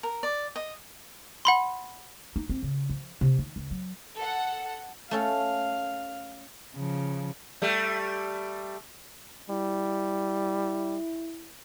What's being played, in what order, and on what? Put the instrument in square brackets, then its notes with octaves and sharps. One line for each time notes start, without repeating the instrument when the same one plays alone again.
[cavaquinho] A#4
D5
D#5
[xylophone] F#5 B5 C6
[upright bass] D#4
C4
C#3
F3
C3
D#3
C#2
F#3
[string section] A4 F#5
[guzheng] A3 C#4 A4 [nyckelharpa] F5
[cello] C#3 F3
[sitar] G3 A3
[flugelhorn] G3 [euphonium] E4